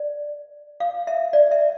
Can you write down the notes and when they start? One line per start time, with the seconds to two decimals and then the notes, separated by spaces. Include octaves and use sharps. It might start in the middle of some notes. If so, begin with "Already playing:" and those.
Already playing: D5
0.80 F5
1.07 E5
1.33 D5
1.51 E5